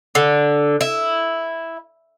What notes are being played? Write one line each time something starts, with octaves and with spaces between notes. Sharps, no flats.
D3
E4